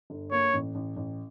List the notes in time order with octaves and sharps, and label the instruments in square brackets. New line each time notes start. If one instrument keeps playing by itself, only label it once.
[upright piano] G1
[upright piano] A#3 [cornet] C#5
[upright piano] A1
A1
A1